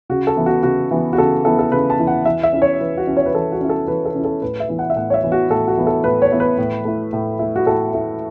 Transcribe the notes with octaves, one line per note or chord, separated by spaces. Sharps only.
C#3 F#4
A4
E3 B3 E4
F#4
C#3 F#4
E3 B3 E4
F#4
C#3 A4
E3 B3 E4 A4
A4
C#3 B4
A5
E3 B3 E4
F#5
E3 E5
E5
C#4 E4
C#5
E3 B4
F#4
C#4 E4
C#5
B4
E3 A4
F#4
C#4 E4
A4
E3 B4
A4
C#4 E4
A4
A2 B4
E5
E3 B3 E4
F#5
E5
A2 F#5
C#5
E5
E3 B3 E4
F#4
A2 A4
F#4
E3 B3 E4
A4
A2 B4
C#5
E3 B3 E4
B4
A2
A3 E4
A2
A3 E4
F#4
A2 A4
A3 E4